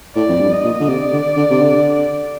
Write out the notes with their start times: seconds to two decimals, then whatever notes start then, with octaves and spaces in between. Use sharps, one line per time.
0.16 A2 D5
0.29 F2
0.40 G2
0.52 D#5
0.64 A#2
0.80 D3
0.88 C3 D5
1.13 D3
1.37 D3
1.51 C3
1.61 D3